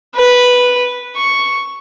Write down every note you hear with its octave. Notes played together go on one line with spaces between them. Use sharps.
B4
C#6